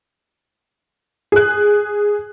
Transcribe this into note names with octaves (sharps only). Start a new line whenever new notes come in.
G#4 F#6